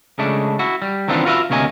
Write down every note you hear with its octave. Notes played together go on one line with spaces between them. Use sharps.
C#3 G#3 A3 D4
E4 F#4
G3
D#3 E3 B3 C4 D4 F4
F4 F#4 B4 C5 E5 F5
D2 C3 A#3 C#5 D#5 G#5